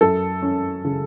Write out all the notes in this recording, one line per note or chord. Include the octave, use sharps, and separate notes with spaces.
F#2 A4
C#4
C#3